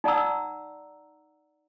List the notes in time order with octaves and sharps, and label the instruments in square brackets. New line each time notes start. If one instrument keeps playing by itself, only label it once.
[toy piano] D#4 D5 F#5 A#5 E6